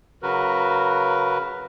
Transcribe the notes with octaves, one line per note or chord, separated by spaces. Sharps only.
C#3 F#3 F#4 A#4 B4